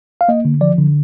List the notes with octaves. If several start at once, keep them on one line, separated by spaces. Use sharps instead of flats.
F5
A#3 D#5
D3
F3 D5
D3